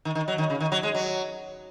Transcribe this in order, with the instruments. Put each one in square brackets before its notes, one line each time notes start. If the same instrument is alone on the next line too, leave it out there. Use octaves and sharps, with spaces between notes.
[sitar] D#3
D#3
F#3
D#3
C#3
D#3
F#3
G#3
F#3